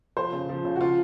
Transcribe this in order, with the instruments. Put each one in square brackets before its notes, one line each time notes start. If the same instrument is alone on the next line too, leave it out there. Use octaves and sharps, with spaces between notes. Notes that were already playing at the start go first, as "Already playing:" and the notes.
[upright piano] F3 C5
C#3
F3
C#3
F#4
F3 F4